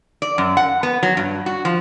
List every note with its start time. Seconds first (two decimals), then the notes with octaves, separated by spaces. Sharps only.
0.22 D5
0.38 F#2
0.57 F#5
0.83 B3
1.03 F#3
1.17 G2
1.46 F#4
1.65 F3